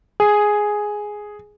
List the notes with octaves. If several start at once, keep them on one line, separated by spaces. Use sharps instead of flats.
G#4